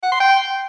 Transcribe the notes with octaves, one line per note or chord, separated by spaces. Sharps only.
F#5
C6
G5